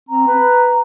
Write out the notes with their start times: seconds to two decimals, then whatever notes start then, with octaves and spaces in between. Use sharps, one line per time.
0.09 C4 A#5
0.28 B4